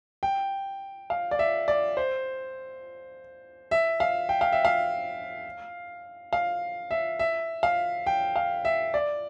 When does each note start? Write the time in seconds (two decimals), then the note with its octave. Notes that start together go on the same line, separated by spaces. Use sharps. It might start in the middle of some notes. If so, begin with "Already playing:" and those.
0.23 G5
1.10 F5
1.31 D5
1.39 E5
1.68 D5
1.97 C5
3.71 E5
4.00 F5
4.29 G5
4.41 F5
4.52 E5
4.65 F5
6.33 F5
6.91 E5
7.19 E5
7.63 F5
8.07 G5
8.36 F5
8.65 E5
8.94 D5